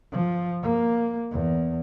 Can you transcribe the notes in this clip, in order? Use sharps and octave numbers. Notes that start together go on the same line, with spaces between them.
F3
A#3
E2